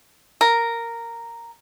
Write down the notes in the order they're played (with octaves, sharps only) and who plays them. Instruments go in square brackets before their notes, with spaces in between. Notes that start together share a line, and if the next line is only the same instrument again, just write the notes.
[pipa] A#4